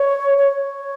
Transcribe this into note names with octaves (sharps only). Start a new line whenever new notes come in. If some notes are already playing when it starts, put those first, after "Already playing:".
Already playing: C#5
C#5